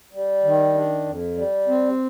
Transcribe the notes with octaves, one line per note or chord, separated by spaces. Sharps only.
G3
D#3
D4
F2
G3
C4